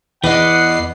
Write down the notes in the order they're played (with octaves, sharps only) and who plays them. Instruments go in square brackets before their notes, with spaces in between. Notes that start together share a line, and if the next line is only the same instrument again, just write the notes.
[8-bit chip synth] E2 C7 [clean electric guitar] E3 [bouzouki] B4 D5 D#5 [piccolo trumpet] F#5